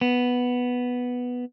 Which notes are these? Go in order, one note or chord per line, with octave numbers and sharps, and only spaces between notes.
B3